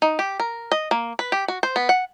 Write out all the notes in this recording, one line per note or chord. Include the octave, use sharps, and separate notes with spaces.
D#4
G4
A#4
D#5
A#3
B4
G4
F#4
C5
B3
F#5